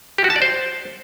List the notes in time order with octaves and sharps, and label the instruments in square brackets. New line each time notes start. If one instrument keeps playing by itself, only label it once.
[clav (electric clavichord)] G4
F#4
A5
D5
C5